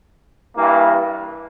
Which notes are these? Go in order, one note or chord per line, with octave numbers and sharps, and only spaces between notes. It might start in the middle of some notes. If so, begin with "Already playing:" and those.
G2 E3 A#3